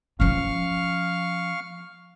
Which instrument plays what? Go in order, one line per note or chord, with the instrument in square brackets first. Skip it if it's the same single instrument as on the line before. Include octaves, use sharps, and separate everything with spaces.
[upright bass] F3 C#4 [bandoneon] F5 C#6 F6